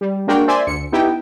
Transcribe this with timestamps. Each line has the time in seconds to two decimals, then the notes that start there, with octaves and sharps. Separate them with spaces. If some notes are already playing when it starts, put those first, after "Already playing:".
0.01 G3
0.27 G#3 A#3 D4 F#4 A#4 G5
0.48 C5 D5 E5 G#5 C6
0.67 D2 C#7
0.92 B3 D#4 E4 G4 G5